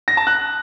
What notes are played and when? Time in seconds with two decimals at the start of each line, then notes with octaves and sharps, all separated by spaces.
0.08 A#6
0.17 A5
0.27 F#6